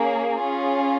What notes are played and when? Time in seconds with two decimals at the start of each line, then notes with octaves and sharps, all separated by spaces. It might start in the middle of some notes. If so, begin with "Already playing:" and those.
Already playing: A#3 C#4 G#4
0.41 C#4 F4 G#4